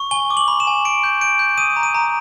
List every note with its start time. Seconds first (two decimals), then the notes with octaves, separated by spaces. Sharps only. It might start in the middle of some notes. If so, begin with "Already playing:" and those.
Already playing: C#6
0.11 G#5 G7
0.30 D6
0.37 F#7
0.48 B5
0.60 E7
0.67 G#5
0.85 B5 D7
1.04 G6
1.21 G6 D7
1.39 G6
1.58 D#6 D#7
1.76 A#5
1.83 D#7
1.95 A#5